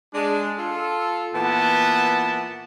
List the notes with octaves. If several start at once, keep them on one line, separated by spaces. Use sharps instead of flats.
G#3 D4
F4 A4
A#2 E3 B3 A5